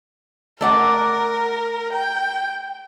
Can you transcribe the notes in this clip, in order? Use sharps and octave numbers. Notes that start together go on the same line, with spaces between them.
A3 A#4 D5 F#5
G5